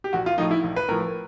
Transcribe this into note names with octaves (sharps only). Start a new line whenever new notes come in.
G4
A#1 F#4
F4
A2 F3 D#4
E4
A#1
B4
A2 F3 A#4